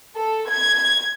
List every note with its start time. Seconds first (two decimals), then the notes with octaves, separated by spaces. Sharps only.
0.17 A4
0.49 G#6